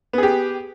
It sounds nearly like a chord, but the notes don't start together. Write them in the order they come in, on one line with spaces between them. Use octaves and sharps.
B3 G#4 G4